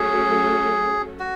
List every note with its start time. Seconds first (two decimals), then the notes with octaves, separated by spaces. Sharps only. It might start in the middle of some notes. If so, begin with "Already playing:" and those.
Already playing: F#3 A3 C#4 F#4 G#4 A4
1.19 F#4